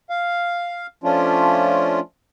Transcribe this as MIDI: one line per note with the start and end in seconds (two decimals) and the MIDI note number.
0.10 0.87 77
1.04 2.00 53
1.04 2.00 57
1.04 2.00 61
1.04 2.00 62
1.04 2.00 65